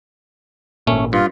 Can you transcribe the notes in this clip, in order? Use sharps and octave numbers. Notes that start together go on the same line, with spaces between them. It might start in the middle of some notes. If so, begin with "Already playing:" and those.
G#1 A#2 A3 C#4
G2 F4